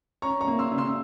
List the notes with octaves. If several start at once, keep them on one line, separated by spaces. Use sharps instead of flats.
C#4 A#5 C#6
A#5 C#6
A#3
C6 E6
C#3
C6 E6